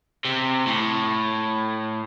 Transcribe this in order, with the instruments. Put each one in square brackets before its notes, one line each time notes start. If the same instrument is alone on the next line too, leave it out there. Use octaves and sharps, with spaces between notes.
[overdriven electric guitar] C3
A2